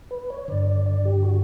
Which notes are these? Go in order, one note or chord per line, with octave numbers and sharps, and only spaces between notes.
B4
C#5
G2 D3 D5
D5
D5
G4
F#4